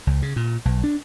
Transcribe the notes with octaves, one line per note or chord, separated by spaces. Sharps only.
C#2
C#3
A#2
B1
D4